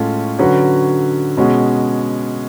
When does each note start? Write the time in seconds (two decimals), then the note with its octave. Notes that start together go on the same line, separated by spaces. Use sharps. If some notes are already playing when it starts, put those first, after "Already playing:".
Already playing: A2 G#3 C#4 F4 A4
0.39 D3 F#3 C#4 F#4 B4
1.37 B2 G#3 C#4 F#4